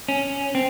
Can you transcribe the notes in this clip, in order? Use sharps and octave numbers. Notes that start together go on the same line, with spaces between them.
C#4
C4